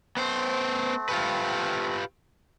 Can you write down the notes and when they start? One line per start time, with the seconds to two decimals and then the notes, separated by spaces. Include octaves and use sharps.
0.17 A3 B3 C4 C5
1.09 F4 G4 B4